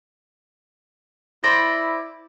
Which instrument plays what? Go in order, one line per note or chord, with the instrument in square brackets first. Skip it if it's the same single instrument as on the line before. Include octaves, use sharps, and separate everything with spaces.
[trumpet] E4 [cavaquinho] C5 D5 B5 [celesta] A#6